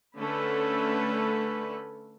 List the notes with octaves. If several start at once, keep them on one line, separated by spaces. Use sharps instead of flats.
D3 A3 C#4 A4 B4